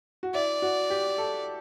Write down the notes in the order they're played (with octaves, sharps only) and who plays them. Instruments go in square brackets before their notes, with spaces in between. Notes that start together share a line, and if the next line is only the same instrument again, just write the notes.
[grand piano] F#4
[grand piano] E4 [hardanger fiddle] D5
[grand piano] F#4
G4
A4